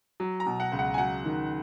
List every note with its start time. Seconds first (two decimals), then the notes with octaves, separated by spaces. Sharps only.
0.20 F#3
0.40 A#5
0.46 B2
0.60 F#5
0.72 C#2
0.79 F#5
0.94 G#5
0.98 F#3 F#5
1.25 D#3